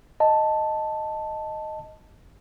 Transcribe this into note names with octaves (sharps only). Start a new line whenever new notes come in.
D#5 A5